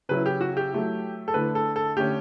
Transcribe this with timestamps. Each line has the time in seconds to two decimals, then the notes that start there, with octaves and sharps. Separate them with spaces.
0.09 C#3 F#3 C#4 E4 B4
0.26 G4
0.41 F#4
0.57 G4
0.72 F#3 A3 E4
1.28 A4
1.34 D3 A3 E4 B4
1.55 A4
1.76 A4
1.97 D3 A3 C#4 G4